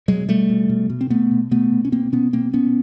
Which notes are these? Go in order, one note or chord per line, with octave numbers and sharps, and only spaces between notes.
B2 F#3 G#3
B2 G3 A3
B2
B2
B2
C4
B2 A3 B3
B2
B2 A3 B3
B2
C#4
B2 A#3 C4
B2 B3 C#4
B2 A#3 C4
B2 B3 C#4